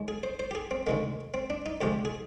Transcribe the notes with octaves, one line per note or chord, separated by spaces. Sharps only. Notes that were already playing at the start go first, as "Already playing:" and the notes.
Already playing: D#2 G#3
G#4
C5
C5
G4
G#4
C4
D2 C3 D#3 G#3 A#3
C4
D4
D#4
D2 C3 F3 G#3 G4
G#4